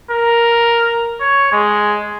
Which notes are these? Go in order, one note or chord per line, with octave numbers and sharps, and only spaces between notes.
A#4
C#5
G#3